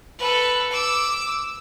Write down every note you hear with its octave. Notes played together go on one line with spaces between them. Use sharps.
A4 B4
D6 E6